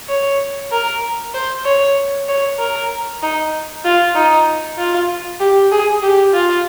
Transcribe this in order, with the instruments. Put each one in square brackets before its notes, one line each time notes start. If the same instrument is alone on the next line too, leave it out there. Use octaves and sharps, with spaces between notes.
[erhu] C#5
A#4
C5
C#5
C#5
A#4
D#4
F4
D#4
F4
G4
G#4
G4
F4